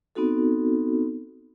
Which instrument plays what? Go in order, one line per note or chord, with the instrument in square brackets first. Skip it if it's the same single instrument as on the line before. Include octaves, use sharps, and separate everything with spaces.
[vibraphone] B3 C4 D#4 F#4 A4